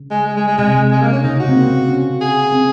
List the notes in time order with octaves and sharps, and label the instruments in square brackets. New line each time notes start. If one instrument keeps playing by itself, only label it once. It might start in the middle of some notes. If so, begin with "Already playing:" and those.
Already playing: [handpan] C#3
[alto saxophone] G#3
G#3
G#3
G#3
[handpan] C3 [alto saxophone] G#3
[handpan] C3
[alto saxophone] G#3
A#3
C#4
[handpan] C#3 [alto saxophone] D#4
[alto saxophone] F#4
[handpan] C4
A#3
C#4
[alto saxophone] G#4
[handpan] C4